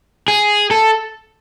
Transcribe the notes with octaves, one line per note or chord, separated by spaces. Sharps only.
G#4
A4